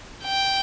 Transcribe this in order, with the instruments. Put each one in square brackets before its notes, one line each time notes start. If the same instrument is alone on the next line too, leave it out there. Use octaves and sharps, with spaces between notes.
[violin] G5